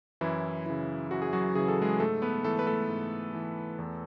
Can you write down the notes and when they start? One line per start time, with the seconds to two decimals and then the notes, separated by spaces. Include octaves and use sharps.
0.21 F#2 E3 E4
0.66 C#3 E3
1.11 F#2 F#4
1.22 G#4
1.33 F#3 F#4
1.55 C#3 E3 G#4
1.68 A4
1.82 G#3 G#4
2.00 G#2 A3 A4
2.22 B3 B4
2.44 E3 A3 A4
2.59 B4
2.67 A3 A4
2.89 G#2
3.34 E3
3.79 E2